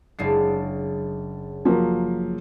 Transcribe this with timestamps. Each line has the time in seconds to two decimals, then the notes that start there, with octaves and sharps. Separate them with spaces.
0.19 F#1 G#3 D4 C7
1.65 F3 F#3 A#3